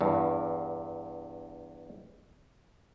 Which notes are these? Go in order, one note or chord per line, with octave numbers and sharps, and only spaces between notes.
E2 G2